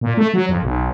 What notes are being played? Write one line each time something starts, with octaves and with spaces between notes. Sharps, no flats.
A#2
A3
F#3
F2
B1